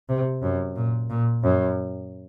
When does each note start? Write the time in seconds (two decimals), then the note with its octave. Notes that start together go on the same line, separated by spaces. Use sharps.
0.09 C3
0.43 F#2
0.76 A#2
1.10 A#2
1.43 F#2